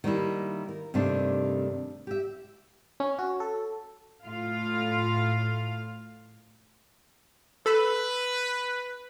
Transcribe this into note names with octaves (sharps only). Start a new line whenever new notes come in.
D#3 G3 A#3 E4
A#4
G2 C3 D#3 A3 D4
G4 E5
C#4
F#4
A4
A2 F4 F5
A4 B4 B5 E6